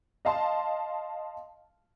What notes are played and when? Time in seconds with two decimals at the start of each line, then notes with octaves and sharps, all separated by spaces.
0.25 D#5 F5 A5 C6